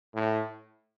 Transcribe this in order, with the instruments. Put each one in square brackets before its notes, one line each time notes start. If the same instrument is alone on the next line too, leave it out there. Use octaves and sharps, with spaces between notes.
[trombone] A2